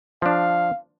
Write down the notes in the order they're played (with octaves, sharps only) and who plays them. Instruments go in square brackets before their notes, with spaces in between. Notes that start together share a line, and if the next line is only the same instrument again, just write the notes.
[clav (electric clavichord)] F3 D4 [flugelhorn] F5